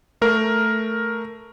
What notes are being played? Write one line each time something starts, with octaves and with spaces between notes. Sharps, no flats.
A3 A#4